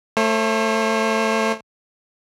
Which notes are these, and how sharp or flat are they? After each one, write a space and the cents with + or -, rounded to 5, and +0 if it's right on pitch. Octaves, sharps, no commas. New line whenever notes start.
A3 +15 C5 +45